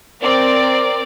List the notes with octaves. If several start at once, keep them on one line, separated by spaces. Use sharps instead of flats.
C4 A#4 D5